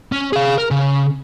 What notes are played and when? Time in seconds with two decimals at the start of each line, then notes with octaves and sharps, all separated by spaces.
0.12 C#4
0.33 G#4 F5
0.58 A#4
0.71 C#3